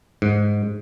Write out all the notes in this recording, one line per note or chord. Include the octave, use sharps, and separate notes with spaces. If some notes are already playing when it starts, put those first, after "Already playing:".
G#2